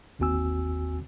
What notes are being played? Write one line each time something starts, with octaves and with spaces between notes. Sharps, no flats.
G1 D#2 C4 F#4 G#5 E6